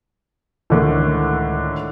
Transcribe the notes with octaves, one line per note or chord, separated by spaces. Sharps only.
C#2 A2 D3 D#3